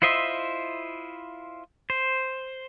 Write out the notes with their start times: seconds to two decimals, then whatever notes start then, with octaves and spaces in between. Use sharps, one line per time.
0.02 E4 F4 C5 D#5 E5
1.90 C5